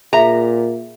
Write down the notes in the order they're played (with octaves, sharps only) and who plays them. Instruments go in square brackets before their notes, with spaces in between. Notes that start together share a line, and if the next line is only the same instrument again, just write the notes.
[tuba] A#2 [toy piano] G#4 E5 F5 [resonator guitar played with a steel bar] A#5